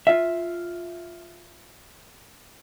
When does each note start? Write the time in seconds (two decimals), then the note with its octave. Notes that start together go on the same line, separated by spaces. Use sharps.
0.07 F4 E5